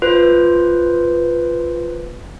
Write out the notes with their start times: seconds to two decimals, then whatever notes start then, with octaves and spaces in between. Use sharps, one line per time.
0.02 F4 B4 C5